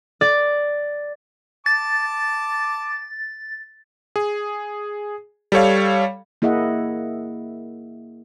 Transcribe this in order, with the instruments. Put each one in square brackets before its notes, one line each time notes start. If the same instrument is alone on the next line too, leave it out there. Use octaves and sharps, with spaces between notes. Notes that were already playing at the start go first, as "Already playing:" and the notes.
[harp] D5
[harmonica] A5 D6 [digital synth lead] A6
[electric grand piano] G#4
G3 A4 C#5 F5
[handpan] A#3 E4 G#4 D#5 E5 F#5